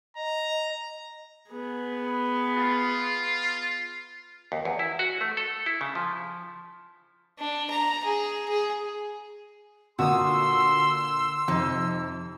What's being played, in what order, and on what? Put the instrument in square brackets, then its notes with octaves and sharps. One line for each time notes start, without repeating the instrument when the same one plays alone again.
[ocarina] D#5 [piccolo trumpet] A#5
[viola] B3 G#4
[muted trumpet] F4
[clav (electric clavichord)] D#2
E2
E4
F#4
A3
A4
E4
C#3
F3
[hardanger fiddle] D4
A#5
G#4
G#4
[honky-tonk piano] A#2 D3 A#3 [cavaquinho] F#4 D#6 [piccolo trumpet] C6 [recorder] E6
[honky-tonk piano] F2 C3 [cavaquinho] D#4